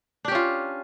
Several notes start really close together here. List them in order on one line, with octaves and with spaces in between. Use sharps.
D4 G4 C#4 F4